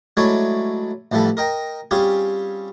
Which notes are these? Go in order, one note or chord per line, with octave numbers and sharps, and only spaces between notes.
F#3 G#3 A3 E4 C#5 D5
A1 E3 F3 G3 A4
A#4 D#5 G5 A#5
G3 C4 C#4 F4 G4 G#4